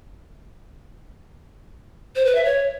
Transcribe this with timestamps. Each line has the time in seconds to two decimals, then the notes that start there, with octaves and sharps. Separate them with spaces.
2.16 C5
2.25 B4
2.35 E5
2.45 C#5